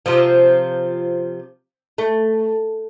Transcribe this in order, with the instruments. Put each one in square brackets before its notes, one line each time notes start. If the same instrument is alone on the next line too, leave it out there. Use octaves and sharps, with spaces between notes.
[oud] C3 F3
A3